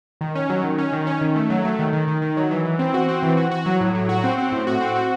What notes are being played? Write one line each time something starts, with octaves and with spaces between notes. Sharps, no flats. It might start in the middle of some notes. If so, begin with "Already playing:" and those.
D#3
C#4
F#3
D#3
C#4
D#3
C#4
D#3
A3
F#3
A3
D#3
D#3
D#3
D#3
F#3
E3
E3
C4
F#4
C4
E3
F#4
F#4
F#3
A2
F#3
F#4
C4
C4
A2
F#4
C4
F#4